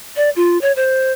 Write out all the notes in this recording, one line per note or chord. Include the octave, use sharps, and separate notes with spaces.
D5
F4
C#5
C5